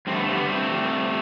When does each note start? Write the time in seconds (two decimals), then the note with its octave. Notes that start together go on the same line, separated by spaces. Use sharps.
0.07 G2 A3 C4
0.16 B3
0.20 A3
0.28 G2 C4
0.34 G3 B3
0.49 G2 A3 C4
0.70 G3
0.92 G3